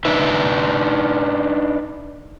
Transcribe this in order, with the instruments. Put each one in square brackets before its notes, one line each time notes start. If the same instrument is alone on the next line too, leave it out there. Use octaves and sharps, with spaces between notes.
[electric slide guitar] D4 D#4 B4 E5